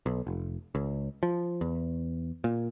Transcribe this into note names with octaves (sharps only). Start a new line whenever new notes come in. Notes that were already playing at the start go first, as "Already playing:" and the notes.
B1
F1
C#2
F3
E2
A#2